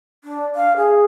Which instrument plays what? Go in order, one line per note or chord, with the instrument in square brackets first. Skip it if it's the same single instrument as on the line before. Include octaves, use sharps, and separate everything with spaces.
[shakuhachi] D4
F5
G#4